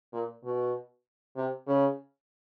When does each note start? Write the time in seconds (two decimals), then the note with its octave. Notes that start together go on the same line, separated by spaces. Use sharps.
0.13 A#2
0.44 B2
1.36 C3
1.67 C#3